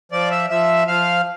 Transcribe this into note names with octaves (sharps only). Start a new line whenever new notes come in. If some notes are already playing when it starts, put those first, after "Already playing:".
F3 D5
E5
F3 E5
F3 F5